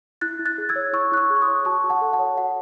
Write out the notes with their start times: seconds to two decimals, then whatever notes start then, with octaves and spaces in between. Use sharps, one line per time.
0.21 E4 F#6 A6
0.39 E4
0.46 F#6 A6
0.58 G#4
0.69 E6 G#6
0.76 C#5
0.93 E4 C#6 E6
1.12 E4 F#6
1.17 C#6 E6
1.30 G#4
1.36 C#6
1.42 C6 D#6
1.47 C#5
1.65 F#4 A5 C#6
1.84 F#4
1.89 F#5 A5
2.01 A4
2.13 F#5 A5
2.19 C#5
2.38 F#4 F#5